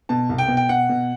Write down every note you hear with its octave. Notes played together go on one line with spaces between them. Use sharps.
B2 A5
C2
G5
B2
G5
B2 F#5
B2